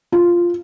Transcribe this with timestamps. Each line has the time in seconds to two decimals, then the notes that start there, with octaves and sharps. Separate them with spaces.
0.12 F4